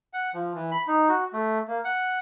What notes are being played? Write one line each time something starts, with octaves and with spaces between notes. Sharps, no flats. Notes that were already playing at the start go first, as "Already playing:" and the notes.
F#5
F3
E3
B5
D#4
F#4
A3
A#3
F#5